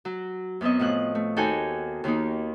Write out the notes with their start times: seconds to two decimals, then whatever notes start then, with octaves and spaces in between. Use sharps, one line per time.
0.05 F#3
0.61 F#2 B3 C4 D#5
0.79 A2 F3 F#6
1.15 A3
1.36 D#2 D#4 F#4 A4 G5 G#5
2.04 D#2 D#3 A#3 D#4